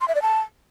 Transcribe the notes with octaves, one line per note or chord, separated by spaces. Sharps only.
C6
E5
D5
A5